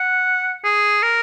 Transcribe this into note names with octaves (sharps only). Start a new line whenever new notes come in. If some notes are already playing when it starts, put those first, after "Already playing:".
Already playing: F#5
G#4
A#4